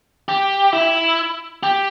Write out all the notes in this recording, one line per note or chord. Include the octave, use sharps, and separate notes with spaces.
G4
E4
G4